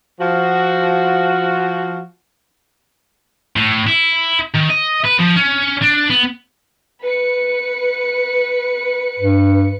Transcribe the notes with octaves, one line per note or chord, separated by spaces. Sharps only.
F3 F#4
A2
E4
D#3
D#5
B4
F3
C#4
D4
B3
B4 C#7
G2